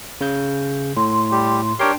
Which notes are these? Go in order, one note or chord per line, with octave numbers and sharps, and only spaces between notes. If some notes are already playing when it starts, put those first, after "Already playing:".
C#3 G6
A2 C6
G3 G4
D4 G4 A#4 C#5 G5 C6